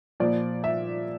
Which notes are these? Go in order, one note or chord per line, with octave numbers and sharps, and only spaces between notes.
A#2 F3 D5
E5